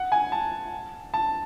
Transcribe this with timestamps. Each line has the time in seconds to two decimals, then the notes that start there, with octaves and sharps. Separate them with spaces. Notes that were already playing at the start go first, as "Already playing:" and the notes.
Already playing: F#5
0.12 G#5
0.32 A5
1.14 A5